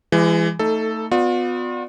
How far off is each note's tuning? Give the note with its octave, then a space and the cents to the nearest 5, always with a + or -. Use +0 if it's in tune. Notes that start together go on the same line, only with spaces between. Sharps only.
E3 +25 G#3 -20
A3 +25 D#4 +20 A4 +0
B3 +25 F4 +45 D5 +10